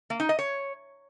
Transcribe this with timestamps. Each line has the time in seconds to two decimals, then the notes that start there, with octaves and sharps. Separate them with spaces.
0.10 A#3
0.20 D#4
0.29 D#5
0.39 C#5